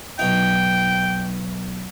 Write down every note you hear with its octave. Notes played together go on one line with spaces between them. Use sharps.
B1 D#4 G5